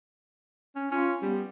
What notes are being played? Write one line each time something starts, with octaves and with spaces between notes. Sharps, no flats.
C#4
C#4 F4
G3 B3